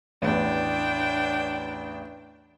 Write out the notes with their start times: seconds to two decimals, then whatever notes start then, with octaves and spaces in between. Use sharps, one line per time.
0.22 A1 E2 D4 G5